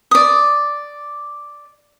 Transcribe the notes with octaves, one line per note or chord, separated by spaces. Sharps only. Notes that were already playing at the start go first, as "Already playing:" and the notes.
D5 D#6